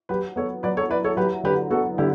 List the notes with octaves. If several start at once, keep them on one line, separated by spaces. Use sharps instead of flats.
F#3 G4 B4
B3 A4 C#5
F#3 B4 D5
A4 C#5
E4 B4 D5
A4 C#5
F#3 G4 B4
D3 G4 B4
B3 F#4 A4
D3 E4 G4